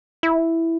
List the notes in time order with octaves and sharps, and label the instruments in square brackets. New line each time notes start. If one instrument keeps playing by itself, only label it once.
[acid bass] E4